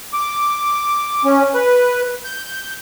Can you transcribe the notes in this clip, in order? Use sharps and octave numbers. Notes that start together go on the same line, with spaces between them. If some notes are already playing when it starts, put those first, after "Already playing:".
D6
C#4
B4
G6